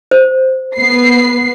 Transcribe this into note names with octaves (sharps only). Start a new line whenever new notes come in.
C5
B3 B4 C7